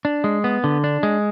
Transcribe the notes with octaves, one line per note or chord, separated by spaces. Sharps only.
D4
G#3
B3
D3
D4
G#3